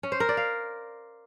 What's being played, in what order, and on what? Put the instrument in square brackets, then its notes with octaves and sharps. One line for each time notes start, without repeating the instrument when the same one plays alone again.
[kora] C#4
C5
A#4
D5
F5